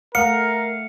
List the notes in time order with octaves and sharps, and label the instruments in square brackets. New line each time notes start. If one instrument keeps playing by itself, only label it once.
[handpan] A3 F#5 [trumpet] A#4 [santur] F5 [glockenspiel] C#7